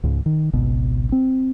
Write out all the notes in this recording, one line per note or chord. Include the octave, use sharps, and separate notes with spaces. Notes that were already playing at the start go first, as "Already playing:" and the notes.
C#2 G#2 C#3
D#3
G#1 C#2 B2
C4